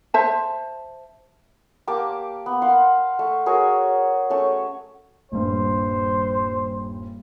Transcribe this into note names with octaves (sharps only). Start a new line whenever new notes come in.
C5 E5 A5
A#3 G4 A5 D6
B3
F5 F#5 C6
A3
F#4 G#4 A#4 C#5
A3 C#4 C#5
D#1 G2 C5